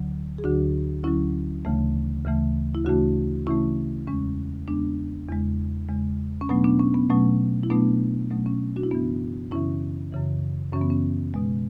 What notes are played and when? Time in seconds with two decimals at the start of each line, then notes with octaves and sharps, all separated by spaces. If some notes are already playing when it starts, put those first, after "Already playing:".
Already playing: D2 D3 F#3
0.38 G#4
0.44 D2 D3 F#3 D4 F#4
1.04 D2 D3 F#3 C#4 E4
1.65 D2 C#3 E3 A3
2.25 D2 C#3 E3 A3
2.75 E4
2.85 D2 C#3 E3 A3 D4 F#4
3.47 D2 C#3 E3 A3 C#4 E4
4.07 E2 C#3 G#3 C#4
4.68 E2 C#3 G#3 B3 D4
5.28 E2 C#3 G#3
5.89 E2 C#3 G#3
6.41 C#4
6.49 B2 F#3 A3 B3 D4
6.64 B3 D4
6.80 C#4
6.95 B3
7.10 B2 F#3 A3 C#4
7.63 E4
7.70 B2 F#3 A3 B3 D4
8.30 B2 F#3 A3 C#4
8.46 C#4
8.76 D4 F#4
8.83 E4
8.91 F#2 C#3 E3 B3 D4
9.51 F#2 C#3 E3 C#4 E4
10.12 F#2 C#3 E3
10.73 F#2 C#3 E3 C#4
10.81 B3
10.90 C#4
11.34 B2 G#3